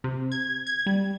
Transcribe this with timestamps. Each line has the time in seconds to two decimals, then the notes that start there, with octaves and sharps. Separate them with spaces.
0.04 C3
0.32 G#6
0.67 G#6
0.86 G3